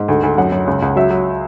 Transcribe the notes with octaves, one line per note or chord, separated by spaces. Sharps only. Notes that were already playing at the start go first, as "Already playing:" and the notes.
Already playing: G#2
D2
D2
F#2 F#5
F#2
C#2
C#2
F#3 E5
F#3